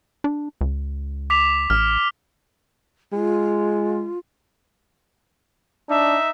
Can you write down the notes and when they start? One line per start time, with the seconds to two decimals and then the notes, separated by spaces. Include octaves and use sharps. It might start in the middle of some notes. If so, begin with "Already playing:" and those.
0.24 D4
0.61 C#2
1.30 D6 B6 F7
1.70 A1 F6
3.12 G#3 F4
5.89 D4 D#4 E5